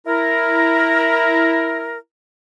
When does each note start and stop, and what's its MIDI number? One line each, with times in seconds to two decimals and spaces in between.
0.07 1.98 64
0.07 1.98 70